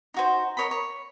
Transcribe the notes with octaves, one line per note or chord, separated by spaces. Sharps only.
D#4 F#4 C5
A#4 C#5 D#5 B5
C#5